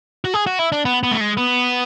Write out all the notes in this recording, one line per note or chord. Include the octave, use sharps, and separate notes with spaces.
F#4
G#4
F#4
E4
D4
B3
B3
A3
G#3
B3